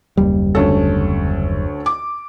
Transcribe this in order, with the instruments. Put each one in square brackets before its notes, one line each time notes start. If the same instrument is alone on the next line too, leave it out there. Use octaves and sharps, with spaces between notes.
[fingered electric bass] F#1 D#2 G3
[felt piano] D2 C#4 A4
D6